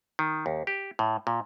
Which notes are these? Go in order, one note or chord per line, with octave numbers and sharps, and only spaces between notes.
D#3
D#2
G4
A2
A#2